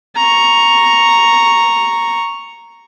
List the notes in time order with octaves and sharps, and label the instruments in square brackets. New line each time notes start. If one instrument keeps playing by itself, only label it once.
[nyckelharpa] A#5 C#6